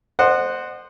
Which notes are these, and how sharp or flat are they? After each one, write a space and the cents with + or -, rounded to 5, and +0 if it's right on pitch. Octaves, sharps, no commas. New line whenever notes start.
C5 +0 D#5 -35 F#5 +0